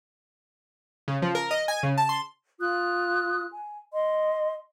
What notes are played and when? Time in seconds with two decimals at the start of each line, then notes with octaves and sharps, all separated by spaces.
1.08 C#3
1.22 F3
1.35 A#4
1.51 D#5
1.68 G#5
1.83 C#3
1.98 A5
2.09 C6
2.60 F4 D#6 F#6
3.53 G#5
3.92 D#5 C6